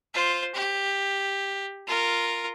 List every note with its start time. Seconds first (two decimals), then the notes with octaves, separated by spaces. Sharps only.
0.14 F4 C5
0.55 G4
1.87 F4 A#4